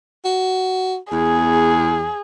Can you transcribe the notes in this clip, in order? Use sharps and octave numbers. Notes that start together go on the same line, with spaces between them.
F#4
E2 G#4